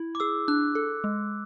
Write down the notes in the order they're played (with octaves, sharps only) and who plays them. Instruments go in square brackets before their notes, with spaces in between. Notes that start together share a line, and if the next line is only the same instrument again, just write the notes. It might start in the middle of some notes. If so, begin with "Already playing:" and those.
Already playing: [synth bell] E4
[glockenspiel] D6
[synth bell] G#4 [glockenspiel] E6
[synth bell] D4 [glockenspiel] F#6
[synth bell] A4
G#3